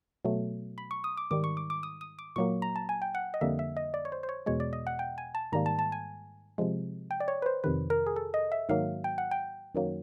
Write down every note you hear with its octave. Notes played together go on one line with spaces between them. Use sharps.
B2 F#3 A3
B5
C#6
D#6
D6
G#2 D#3 G3 D6
C#6
D6
D6
D#6
D#6
D6
A#2 F#3 A#3 C#6
A#5
A5
G#5
G5
F#5
D#5
F2 D3 G3 A#3 E5
E5
D#5
D5
C#5
C5
C5
C#5
E2 B2 G#3 C#5
D5
D#5
F#5
G5
G#5
A5
G#2 D#3 G3 A#3 A#5
A5
A5
G#5
C3 F3 G#3
G5
D5
C#5
B4
C5
F2 C3 D#3 B4
A#4
G#4
A4
D#5
E5
G#2 D#3 F#3 A#3 F5
G5
F#5
G5
F#2 D#3 F#3 A#3